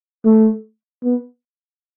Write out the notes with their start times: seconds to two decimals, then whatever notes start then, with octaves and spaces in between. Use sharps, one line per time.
0.25 A3
1.04 B3